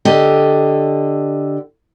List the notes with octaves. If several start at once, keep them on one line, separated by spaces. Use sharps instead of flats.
D3 G4 A4 D#5